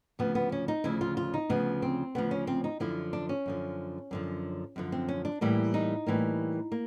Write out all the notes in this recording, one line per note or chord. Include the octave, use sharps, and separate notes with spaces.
D2 C#3 F3 B3
B3
C#4
D#4
D2 C#3 F3 E4
F4
F4
D#4
D2 C#3 F3 B3
C4
D2 C#3 F3 B3
C#4
C4
D#4
F#2 D3 F3 E4
D4
C#4
F#2 D3 F3
F#2 D3 F3
F#2 D3 F3
C4
C#4
D4
A2 E3 G3 A#3 E4
D#4
A2 E3 G3 A#3
A#3